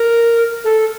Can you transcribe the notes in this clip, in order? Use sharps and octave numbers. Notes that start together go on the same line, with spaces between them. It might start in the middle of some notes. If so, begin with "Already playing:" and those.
Already playing: A#4
A4